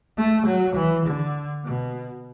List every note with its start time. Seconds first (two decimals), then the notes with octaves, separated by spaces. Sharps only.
0.17 A3
0.47 F#3
0.76 E3
1.06 D3
1.64 B2